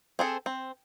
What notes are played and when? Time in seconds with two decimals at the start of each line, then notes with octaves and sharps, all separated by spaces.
0.19 C4 G#4 A4
0.46 C4